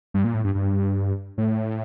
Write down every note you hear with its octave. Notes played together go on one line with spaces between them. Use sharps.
G2
A#2
A2
G2
G2
A2